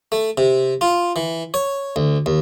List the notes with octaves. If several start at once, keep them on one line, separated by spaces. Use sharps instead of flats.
A3
C3
F4
E3
C#5
D2
D#2